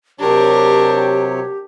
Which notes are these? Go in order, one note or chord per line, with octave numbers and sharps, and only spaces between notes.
C3 F#3 D4 G4 A#4 C#5